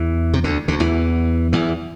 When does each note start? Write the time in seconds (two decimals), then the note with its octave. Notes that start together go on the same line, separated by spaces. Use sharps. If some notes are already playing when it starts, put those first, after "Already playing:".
Already playing: E2 E3
0.34 C3
0.44 D2 D3
0.68 D2 D3
0.80 E2 E3
1.53 E2 E3